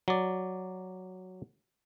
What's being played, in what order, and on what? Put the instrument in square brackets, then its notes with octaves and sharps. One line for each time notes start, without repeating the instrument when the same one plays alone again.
[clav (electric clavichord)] F#3 D5